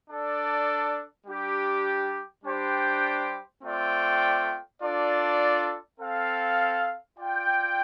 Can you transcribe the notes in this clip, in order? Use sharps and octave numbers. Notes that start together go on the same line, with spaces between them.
D4 A4 D5
G3 D4 G4
G3 D4 G4 C5 G5
A3 C4 F4 D5 G5
D4 F4 A4 D5
C4 A4 F5
F4 D5 G5